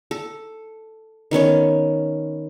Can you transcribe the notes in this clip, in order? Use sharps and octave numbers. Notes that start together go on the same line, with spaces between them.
A4
D#3 B3 C#4 C#5